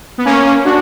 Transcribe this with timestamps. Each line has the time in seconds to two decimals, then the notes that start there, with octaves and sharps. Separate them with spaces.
0.18 B3
0.25 A#3 C#4
0.65 D4 F#4